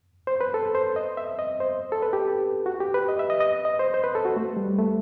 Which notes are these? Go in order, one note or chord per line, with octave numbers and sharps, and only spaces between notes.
C5
B4
A4
C5
D#5
E5
D#5
C5
A4
B4
G4
F#4
G4
B4
D#5
E5
D#5
D#5
D#5
C5
C5
B4
A4
F#4
A3
G3
A3